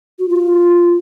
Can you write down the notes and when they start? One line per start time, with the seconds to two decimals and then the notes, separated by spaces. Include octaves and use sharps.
0.19 F#4
0.29 F4